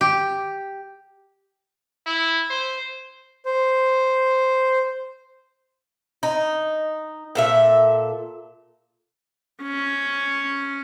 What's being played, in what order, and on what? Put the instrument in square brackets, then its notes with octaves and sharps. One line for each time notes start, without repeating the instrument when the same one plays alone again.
[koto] G4
[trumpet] E4
C5
[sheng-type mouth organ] C5
[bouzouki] D#4
A#2 A4 E5
[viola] C#4